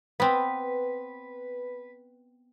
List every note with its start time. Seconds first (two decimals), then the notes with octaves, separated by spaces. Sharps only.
0.20 B3 C4 B4